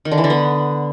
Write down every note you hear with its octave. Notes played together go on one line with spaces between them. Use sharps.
D#3
D3
E3
D3
B3